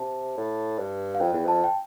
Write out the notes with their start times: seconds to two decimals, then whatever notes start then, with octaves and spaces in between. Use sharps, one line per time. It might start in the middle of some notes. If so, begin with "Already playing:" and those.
Already playing: C3 A5
0.37 A2
0.79 G2
1.15 F5
1.20 F2 G5
1.33 E2
1.45 F2 A5
1.64 G5